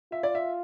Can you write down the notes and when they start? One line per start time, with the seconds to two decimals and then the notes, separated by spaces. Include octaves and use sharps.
0.12 F4 E5
0.23 D5
0.35 E5